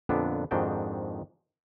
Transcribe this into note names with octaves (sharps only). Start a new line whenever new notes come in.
F2 A#2 D3 B3 D4
F2 G#2 D#3 D4 F#4 G5